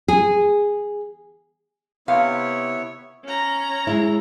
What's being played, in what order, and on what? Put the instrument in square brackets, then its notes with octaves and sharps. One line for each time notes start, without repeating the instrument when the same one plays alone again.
[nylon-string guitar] G#4
[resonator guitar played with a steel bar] C3 F5 [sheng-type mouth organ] B3 E4 C#5
[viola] C#4 A#5
[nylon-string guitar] G#3 E4